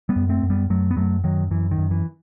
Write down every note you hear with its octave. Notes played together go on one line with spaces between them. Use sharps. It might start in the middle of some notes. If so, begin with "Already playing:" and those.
G3 B3
F#2
A3 C4
F#2
G3 B3
F#2 F#3 A3
B3
F#2 F#3 A3
F#2 D#3 F#3
F#2 E3
D#3
F#2
E3